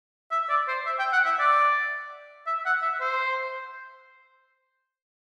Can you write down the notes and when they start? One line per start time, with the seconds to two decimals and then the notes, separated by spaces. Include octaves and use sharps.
0.31 E5
0.49 D5
0.68 C5
0.86 E5
0.99 G5
1.13 F#5
1.25 E5
1.39 D5
2.47 E5
2.65 F#5
2.82 E5
3.00 C5